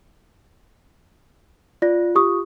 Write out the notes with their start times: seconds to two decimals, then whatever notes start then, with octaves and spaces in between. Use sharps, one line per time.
1.82 F4 D5 A#6
2.15 G4 C#6 D#6